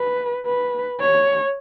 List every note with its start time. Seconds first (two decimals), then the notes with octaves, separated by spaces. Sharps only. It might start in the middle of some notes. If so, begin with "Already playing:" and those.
Already playing: B4
0.46 B4
1.00 C#5